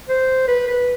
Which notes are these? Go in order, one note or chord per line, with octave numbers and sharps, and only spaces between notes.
C5
B4
B4